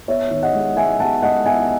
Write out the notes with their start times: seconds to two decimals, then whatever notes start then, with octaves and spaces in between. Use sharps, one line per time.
0.08 B3 C#5 E5
0.31 D#3
0.43 D#5 F#5
0.54 G#3
0.76 G#3 E5 G#5
1.00 B3 F#5 A5
1.22 G#3 D#5 F#5
1.45 B3 E5 G#5